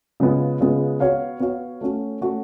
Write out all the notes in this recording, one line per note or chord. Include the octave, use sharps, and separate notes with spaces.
C#3 G#3 B3 F4
C#3 G#3 B3 F4
B3 F#4 C#5 F5
B3 F#4 C#5 F5
A3 C#4 F#4
A3 C#4 F#4